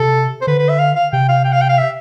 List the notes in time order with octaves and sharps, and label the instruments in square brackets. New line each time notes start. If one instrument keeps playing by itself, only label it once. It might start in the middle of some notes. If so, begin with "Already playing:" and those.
Already playing: [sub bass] C3 [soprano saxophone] A4
[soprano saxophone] C5
[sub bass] D3 [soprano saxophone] B4
[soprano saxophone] B4
E5
F5
F5
[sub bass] C3 [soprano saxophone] G5
[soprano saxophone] F5
G5
F5
G5
F5
E5